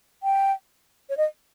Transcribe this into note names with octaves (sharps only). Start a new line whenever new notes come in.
G5
C#5
D#5